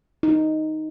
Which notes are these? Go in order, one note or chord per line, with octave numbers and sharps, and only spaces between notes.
D#4